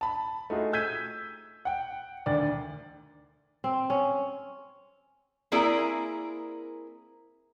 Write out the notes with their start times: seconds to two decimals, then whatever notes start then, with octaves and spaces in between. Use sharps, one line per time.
0.01 A5 B5
0.50 A3 D#4 F4 F#4 G#4
0.73 E6 G6 G#6 B6 D#7
1.65 F#5 G5
2.26 D2 D#3 D5
3.64 C4
3.90 C#4
5.52 A#3 C4 E4 G#4 A#4 D5